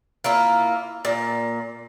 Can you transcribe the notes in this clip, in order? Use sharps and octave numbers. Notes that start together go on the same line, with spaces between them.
A#3 E4 F4
A#2